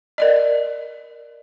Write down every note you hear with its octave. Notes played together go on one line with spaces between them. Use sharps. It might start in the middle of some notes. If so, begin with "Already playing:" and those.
A#4 D5 D#5